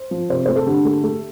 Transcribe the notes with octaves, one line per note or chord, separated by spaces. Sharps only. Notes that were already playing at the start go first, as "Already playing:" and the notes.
Already playing: C5
F3
C3 C5
A3 C5
A4
D3 G4
A3
A3